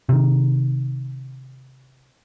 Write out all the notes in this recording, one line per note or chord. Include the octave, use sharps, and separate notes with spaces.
C3 D#3